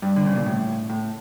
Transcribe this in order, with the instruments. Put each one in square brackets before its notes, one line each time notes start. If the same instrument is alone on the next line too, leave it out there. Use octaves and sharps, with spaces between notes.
[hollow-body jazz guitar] G2
D3
C#3
A#2
A2
A2